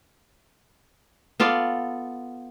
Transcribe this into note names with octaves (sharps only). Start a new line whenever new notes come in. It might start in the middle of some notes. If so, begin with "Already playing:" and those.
B3 F4 A4 D5